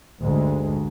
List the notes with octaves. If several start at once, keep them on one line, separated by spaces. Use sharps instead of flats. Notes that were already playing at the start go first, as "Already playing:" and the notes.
A1 D2 G2 G#3